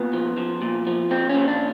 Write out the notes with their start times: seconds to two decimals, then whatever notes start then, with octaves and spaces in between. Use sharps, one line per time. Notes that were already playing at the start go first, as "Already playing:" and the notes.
Already playing: A#2 B3
0.13 F3
0.37 F3
0.62 A#2
0.87 F3
1.11 A#2 C4
1.30 C#4
1.36 A#2
1.48 D4